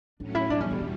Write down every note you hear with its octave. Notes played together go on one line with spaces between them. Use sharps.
A2 F#3 C#4 D4
E4
E2 B2 G3 D4
C#4
D3
E3